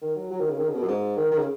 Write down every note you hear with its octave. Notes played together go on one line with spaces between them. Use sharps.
D#3
F#3
F#3
D#3
C#3
D#3
C#3
B2
F#2
G#2
D#3
D#3
C#3